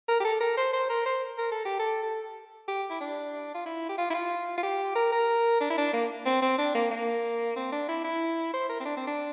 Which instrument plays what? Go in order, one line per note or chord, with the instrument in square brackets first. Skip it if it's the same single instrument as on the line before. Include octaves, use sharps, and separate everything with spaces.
[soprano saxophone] A#4
G4
A4
A#4
C5
C5
A#4
C5
A#4
A4
G4
A4
A4
G4
E4
D4
F4
E4
G4
F4
E4
F4
F4
G4
A#4
A#4
D4
E4
D4
A#3
C4
C4
D4
A#3
A#3
C4
D4
E4
E4
C5
A#4
C4
D4
C4
D4